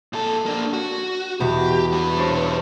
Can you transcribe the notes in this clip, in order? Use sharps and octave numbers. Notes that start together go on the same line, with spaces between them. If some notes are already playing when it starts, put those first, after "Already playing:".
A#2 A4
A#3 D4
F#4
E2 B2 G4
G3 B4
D4 C5 C#5